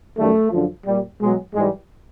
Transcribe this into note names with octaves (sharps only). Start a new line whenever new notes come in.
F#2 D#3 G3 A3
F#2 D3 F3
A#2 G3
B2 F#3 G#3
G#2 E3 G3 G#3